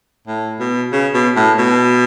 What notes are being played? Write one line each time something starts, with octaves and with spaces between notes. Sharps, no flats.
A2
B2
C#3
B2
A2
B2